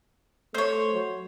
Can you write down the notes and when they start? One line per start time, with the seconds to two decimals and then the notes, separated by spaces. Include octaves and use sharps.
0.54 A3 C5 C#5
0.93 F#3